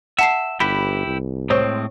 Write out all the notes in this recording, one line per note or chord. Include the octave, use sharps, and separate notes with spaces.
E5 F#5 A5 C7
G1 E4 G4 B4 B5
C2
A2 G#3 C4 C5 C#5